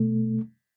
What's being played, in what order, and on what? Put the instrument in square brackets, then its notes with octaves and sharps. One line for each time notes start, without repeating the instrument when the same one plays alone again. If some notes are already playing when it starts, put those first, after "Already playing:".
Already playing: [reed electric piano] B2 A3